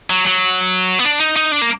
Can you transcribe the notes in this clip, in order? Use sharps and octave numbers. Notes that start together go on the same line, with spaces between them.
F#3
F#3
B3
D4
D#4
D#4
D4
A#3